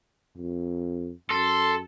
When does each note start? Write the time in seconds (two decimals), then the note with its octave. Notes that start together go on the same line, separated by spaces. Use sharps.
0.37 F2
1.30 F#2 A4 C6